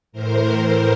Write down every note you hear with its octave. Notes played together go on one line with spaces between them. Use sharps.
A2 E3 A#4 C5